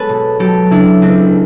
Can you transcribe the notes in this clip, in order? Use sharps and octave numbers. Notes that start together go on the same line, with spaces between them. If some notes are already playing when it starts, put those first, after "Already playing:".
Already playing: G#3 B3 A4 B4 C#5
B2
F#3 G4 A4
C#3 D4 E4
C#2 C4 D4